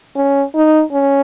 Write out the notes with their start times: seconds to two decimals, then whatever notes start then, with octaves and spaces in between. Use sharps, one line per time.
0.16 C#4
0.55 D#4
0.93 C#4